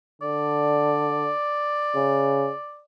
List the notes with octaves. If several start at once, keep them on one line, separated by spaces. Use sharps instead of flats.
D3 D5
C#3